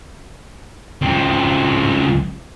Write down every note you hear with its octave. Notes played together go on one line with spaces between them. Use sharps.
C#2 C4